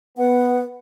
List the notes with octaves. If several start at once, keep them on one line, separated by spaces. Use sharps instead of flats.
B3 B4 F#5